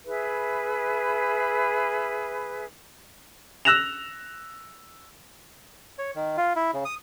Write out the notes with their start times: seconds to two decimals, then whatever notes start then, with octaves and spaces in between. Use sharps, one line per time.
0.05 E4 G#4 B4 E5
3.65 E6 F#6 A#6 E7 F7
5.98 C#5
6.15 D#3
6.37 F4
6.56 E4
6.73 C#3
6.85 D#6